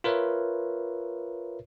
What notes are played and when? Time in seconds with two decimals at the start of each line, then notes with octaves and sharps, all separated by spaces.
0.04 F4 A#4 B4 C#5 E5